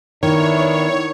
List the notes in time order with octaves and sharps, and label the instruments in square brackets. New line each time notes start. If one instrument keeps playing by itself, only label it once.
[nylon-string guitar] D#3 [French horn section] B3 D4 E4 [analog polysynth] C#5